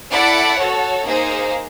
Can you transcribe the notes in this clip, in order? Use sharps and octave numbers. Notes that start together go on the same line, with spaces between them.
E4 A4 D5 F#5
F#4 A4 C#5
A#3 D#4 G#4 C5 F5